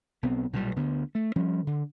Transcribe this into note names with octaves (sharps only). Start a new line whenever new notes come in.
B1 B3 C4
B1 A#2 F#3 G3
D2 D3 B3
A3
F3 G3 C#4
D3